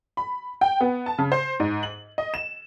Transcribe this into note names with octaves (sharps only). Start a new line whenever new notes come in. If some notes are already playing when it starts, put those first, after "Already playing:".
B5
G5
B3
A5
C#3
C5
G#2
F#7
D#5
E7